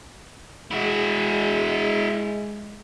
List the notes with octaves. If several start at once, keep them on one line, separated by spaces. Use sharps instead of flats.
G#3 E4 F#4